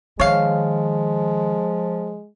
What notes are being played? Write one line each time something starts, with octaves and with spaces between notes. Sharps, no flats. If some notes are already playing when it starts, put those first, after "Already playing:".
D#3 F3 G#3 C#5 F5